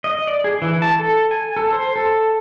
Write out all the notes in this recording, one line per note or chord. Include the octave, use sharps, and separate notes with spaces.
D#5
D5
G#4
E3
A5
A4
G#5
A4
C5
A4